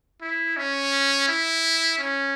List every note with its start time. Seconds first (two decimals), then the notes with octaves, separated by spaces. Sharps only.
0.21 E4
0.57 C#4
1.28 E4
1.98 C#4